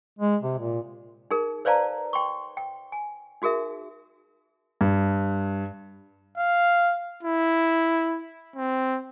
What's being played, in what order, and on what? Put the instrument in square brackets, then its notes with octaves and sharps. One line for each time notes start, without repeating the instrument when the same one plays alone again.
[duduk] G#3
C3
A#2
[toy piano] D#4 G#4 A#4
B4 C5 D5 F5 A5 A#5
G5 C6 C#6
G5
G#5
D#4 F#4 G#4 A#4 E5
[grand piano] G2
[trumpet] F5
E4
C4